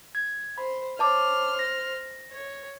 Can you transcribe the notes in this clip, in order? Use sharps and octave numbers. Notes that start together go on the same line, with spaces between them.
G#6
C5 B5
C5 C#5 A5 D6 F6
A#6
C#5